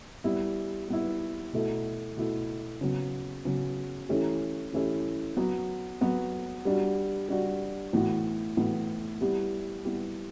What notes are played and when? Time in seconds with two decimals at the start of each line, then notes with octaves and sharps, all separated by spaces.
0.24 G3 B3 E4
0.89 G3 B3 E4
1.53 B2 A3 E4
2.17 B2 A3 E4
2.81 C#3 F#3 B3
3.45 C#3 F#3 B3
4.09 E3 A3 C#4 E4 G4
4.73 E3 A3 C#4 E4 G4
5.37 F#3 B3 F#4
6.01 F#3 B3 F#4
6.65 G3 D4 F#4
7.29 G3 D4 F#4
7.93 A2 E3 B3 F#4
8.57 A2 E3 B3 F#4
9.21 G3 B3 E4 G4
9.85 G3 B3 E4 G4